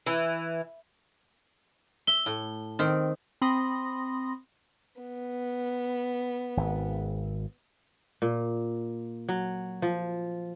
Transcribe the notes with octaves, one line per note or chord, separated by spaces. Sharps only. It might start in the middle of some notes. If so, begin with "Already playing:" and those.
E3
E5 G7
A2
D#3 C4
C4 B5 C6 D#6 A#6
B3
G#1
A#2
F#3
F3